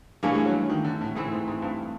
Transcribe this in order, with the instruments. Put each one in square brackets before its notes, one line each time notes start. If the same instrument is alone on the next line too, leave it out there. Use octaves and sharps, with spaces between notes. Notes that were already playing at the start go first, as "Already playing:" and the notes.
[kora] G2 E3 A3 C#4 [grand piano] A#3
[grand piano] G#3
F#3
D#3
D3
A2
[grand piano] G#2 [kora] E3 A3 C4 E4
[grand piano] G#2
G#2
G2